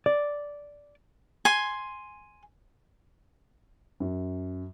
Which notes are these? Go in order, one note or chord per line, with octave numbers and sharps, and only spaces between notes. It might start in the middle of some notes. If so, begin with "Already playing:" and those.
D5
G#5 C6
F#2